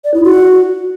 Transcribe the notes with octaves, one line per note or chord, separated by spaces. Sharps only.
D5
E4
F#4